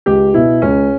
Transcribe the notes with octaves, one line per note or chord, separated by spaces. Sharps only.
C#2 G4
B2 E4
C#2 C#4